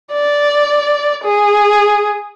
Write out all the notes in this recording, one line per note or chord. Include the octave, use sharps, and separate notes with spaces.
D5
G#4